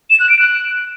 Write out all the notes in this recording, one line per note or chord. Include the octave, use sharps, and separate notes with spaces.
E7
F#6
D7
F#6